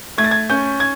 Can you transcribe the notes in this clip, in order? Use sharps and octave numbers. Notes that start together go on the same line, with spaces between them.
A3 G#6
A6
G#6
C#4 G6
G#6